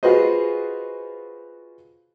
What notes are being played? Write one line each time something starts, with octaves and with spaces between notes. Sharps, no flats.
F4 F#4 G#4 B4 C5 D#5